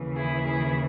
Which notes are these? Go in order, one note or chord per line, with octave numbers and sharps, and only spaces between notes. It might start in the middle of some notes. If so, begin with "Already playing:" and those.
Already playing: D#2 C#3 E3
E4 G#4
E4 G#4